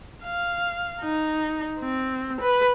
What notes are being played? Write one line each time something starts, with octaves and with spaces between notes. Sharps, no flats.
F5
D#4
C4
B4